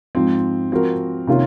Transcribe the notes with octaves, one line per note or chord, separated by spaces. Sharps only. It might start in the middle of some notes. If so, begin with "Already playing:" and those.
G#2 F3 C4
F3 C4 F#4 A#4
C3 D#3 A#3 C#4 F4